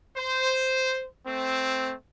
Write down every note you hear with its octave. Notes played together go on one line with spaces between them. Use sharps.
C5
A3 C4